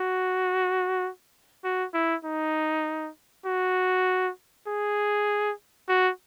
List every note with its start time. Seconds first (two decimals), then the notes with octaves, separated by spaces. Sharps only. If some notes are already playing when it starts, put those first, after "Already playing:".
Already playing: F#4
1.64 F#4
1.94 E4
2.25 D#4
3.45 F#4
4.67 G#4
5.89 F#4